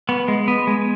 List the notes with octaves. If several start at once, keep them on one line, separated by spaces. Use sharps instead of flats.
B3
G#3
B3
G#3